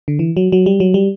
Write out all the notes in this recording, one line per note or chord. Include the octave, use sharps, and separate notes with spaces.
D3
E3
F#3
F#3
G3
F#3
G3